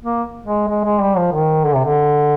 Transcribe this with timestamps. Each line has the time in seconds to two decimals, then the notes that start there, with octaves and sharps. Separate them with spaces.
0.03 A#3
0.46 G#3
0.68 G#3
0.84 G#3
1.01 G3
1.17 F3
1.33 D#3
1.65 D3
1.75 C3
1.85 D3